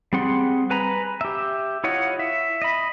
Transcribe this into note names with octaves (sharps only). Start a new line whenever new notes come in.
G3 C4 G#4 F#5 C6
B4 G#5 A#5 B5
G4 E5
E4 F4 C#5 D#5 F#5
E5
D#5 B5